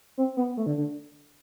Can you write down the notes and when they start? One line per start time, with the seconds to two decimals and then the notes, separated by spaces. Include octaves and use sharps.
0.18 C4
0.37 B3
0.57 A3
0.66 D3
0.77 D3